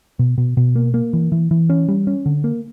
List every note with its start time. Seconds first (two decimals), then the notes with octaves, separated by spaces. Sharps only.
0.19 B2
0.38 B2
0.57 B2
0.76 A#3
0.94 A#3
1.13 E3
1.32 E3
1.51 E3
1.70 C#4
1.89 G3
2.07 C#4
2.26 D3
2.44 A#3